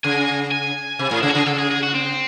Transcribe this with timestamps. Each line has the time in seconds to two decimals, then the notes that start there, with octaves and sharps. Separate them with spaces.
0.04 C#3 G#5
0.51 G#5
0.99 C3
1.11 A2
1.20 C#3 E4
1.29 F#4
1.35 C#3 G#4
1.46 C#3 A4
1.58 G#4
1.71 G#4
1.83 F#4
1.94 C4